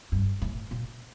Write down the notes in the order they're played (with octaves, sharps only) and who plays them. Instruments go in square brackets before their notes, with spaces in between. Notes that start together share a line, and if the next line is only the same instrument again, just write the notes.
[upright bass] G2
A2
A#2